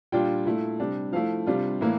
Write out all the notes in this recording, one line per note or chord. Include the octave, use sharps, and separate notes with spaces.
A#2 G3 D4 F4 G5
A#2 A3 E4
C3 G3 D4
F3 A3 E4 F5
C3 G3 D4 F4
A2 E3 A#3 E4